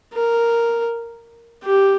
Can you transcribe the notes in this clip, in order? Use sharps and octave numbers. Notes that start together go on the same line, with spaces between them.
A#4
G4